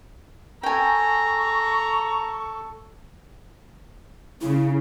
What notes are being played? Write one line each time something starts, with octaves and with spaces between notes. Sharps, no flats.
A4 G5 G#5 A#5 C#6
C#3 E4